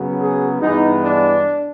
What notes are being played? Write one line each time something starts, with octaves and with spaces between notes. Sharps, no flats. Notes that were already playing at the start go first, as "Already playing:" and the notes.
Already playing: F#2 C#3 F#3 B3
G#4
G2 E3 G#3 B3 D#4
D4